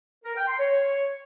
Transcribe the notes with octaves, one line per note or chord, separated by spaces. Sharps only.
A#4
G5
C6
C#5